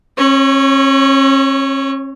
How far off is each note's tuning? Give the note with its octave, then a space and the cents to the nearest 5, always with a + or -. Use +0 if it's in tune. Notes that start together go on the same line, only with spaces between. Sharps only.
C#4 -45 C#5 +0